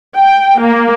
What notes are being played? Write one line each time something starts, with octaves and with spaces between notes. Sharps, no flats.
G5
A#3